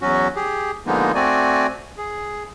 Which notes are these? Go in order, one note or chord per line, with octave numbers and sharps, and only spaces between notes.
E2 F#3 C#4 F#4
G4 G#4
D3 F3 G#3 A#3 B3 D#4
A3 C4 F#4 D5 G#5
G#4